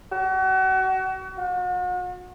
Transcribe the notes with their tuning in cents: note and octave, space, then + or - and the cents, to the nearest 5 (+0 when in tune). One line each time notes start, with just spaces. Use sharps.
F#4 +35
F#4 -40